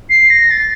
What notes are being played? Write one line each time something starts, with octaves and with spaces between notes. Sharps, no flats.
C7
A#6
A6